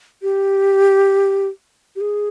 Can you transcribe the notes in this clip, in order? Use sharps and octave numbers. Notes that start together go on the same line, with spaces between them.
G4
G4
G#4